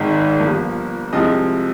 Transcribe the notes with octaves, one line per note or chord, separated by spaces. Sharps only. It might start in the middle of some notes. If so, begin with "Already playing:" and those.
Already playing: G#1 G#2 D#3 G#3
G1 G2 F3 A#3
C2 C3 F3 G#3 D#5